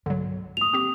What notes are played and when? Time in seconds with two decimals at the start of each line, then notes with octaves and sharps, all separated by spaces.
0.06 B1 G2 D3 F#3
0.57 D#2 A2 D#6 F7
0.73 C4 G4